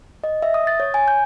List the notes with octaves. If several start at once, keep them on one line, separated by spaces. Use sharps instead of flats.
D#5
E5
D#6
A6
C#5
G#5
G6